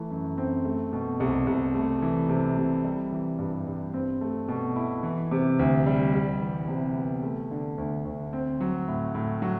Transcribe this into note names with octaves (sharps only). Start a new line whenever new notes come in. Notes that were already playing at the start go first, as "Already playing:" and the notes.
Already playing: E3 A3
F#2
C4
A3
B2
C2
C2
A3
E3
C3
C3
G3
E3
G2
G2
C4
A3
B2
E4
E3
C3
D2
G3
G3
E3
C3
B3
A3
D3
D2
D2
C4
F#3
A2
A2
F#3